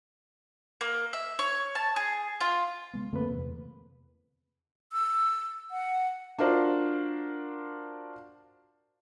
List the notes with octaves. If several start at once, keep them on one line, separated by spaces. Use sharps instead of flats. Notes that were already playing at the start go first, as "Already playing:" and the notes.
A#3
E5
C#5
A5
G#4
F4
C#3 G#3 B3
F#2 D3 A3 A#3 C4 B4
E2 C3
E6
F#5
D4 F4 F#4 A#4 C5 D5